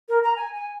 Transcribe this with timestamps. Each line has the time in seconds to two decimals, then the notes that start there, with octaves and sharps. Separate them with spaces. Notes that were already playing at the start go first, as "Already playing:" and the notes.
0.09 A#4
0.24 A#5
0.36 G#5
0.55 G#5